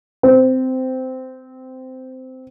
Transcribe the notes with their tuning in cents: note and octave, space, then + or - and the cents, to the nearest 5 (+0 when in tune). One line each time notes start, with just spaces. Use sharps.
C4 -15